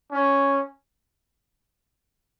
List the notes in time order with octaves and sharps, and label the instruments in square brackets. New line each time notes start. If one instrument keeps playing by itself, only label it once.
[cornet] C#4